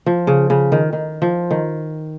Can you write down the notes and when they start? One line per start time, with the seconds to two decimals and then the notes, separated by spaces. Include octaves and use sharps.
0.06 F3
0.27 C#3
0.50 C#3
0.72 D#3
0.93 D#3
1.22 F3
1.51 D#3